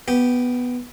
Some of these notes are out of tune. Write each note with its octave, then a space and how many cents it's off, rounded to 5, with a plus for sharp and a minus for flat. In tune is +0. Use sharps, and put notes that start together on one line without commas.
B3 +0 G4 -10